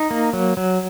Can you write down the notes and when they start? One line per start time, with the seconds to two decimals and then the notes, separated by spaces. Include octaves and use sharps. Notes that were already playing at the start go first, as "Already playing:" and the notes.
Already playing: D#4
0.11 A#3
0.33 F#3
0.57 F#3